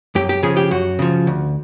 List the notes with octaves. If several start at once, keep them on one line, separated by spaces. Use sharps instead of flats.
F#2 G4
G4
C#3 F3 G#4
G4
F#2 F#4
C#3 F3
D2